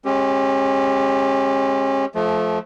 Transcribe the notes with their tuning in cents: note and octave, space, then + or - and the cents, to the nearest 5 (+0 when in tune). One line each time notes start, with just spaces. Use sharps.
G#3 +0 C#4 -30 G4 +0
F3 +0 A3 -25